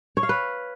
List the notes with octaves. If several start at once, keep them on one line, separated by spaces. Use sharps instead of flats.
C#5
F5
B4